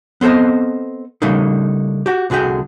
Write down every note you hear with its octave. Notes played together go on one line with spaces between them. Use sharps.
B3 C4 A4 C5 D#5
C#3 G3 A3 A#3 D4 D#4
F#4 G4
C2 D3 F#4 G#4 G5